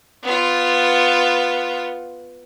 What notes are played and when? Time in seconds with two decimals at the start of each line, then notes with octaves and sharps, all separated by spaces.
0.23 B3 F4